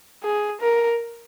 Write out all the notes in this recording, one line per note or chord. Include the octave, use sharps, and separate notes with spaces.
G#4
A#4